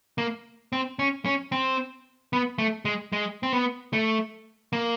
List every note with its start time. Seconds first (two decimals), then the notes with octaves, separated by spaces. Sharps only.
0.18 A#3
0.73 C4
0.99 C#4
1.26 C#4
1.52 C4
2.33 B3
2.58 A3
2.85 G#3
3.13 G#3
3.43 C4
3.53 B3
3.93 A3
4.73 A#3